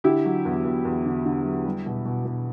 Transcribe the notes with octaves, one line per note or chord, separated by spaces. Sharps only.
D3 E4 G4
F#3
E2
E2
E2
D3
D3
F#3
G3
B2
B2
B2